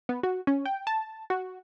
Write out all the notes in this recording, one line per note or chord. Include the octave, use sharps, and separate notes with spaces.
B3
F#4
C#4
G5
A5
F#4